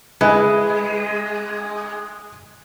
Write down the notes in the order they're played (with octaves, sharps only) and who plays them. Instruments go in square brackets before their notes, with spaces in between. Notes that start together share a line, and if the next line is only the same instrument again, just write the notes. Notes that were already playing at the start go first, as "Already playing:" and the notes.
[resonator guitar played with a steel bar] G#3 [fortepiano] E4 B4